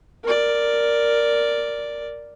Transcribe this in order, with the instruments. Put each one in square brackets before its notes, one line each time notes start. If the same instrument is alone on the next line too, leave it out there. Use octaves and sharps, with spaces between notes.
[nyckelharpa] A#4 D5